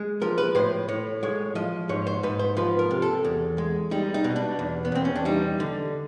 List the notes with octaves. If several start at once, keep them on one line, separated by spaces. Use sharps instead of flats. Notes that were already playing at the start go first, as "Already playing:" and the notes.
Already playing: G#3
F3 A#4
B4
A2 C5
A2 C#5
G#3 C#5
F3 D#5
G#2 C#5
C5
G#2 B4
C5
F3 B4
A#4
C3
A4
E2
G#3
G3 D#4
D#4
B2
D4
E2
B3
E2 C4
C#4
D4
G3 D#4
D3